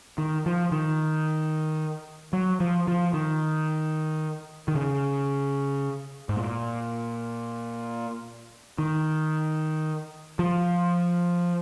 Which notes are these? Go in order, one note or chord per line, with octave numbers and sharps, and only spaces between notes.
D#3
F3
D#3
F#3
F3
F3
D#3
D#3
C#3
G#2
A#2
D#3
F3